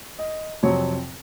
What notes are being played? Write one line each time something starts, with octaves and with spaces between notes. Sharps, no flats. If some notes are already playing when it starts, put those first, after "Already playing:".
D#5
F2 C3 F#3 C4 C#5